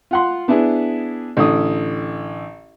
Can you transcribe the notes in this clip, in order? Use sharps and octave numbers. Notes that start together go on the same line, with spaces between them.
F4 F#5 C6
B3 D4 E4 G#4
A1 D3 D#6